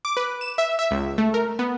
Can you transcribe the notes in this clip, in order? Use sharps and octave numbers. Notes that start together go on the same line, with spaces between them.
D6
B4
E7
E5
E5
C#2
A3
A#4
B3